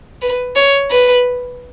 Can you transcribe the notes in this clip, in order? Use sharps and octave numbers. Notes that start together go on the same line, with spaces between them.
B4
C#5
B4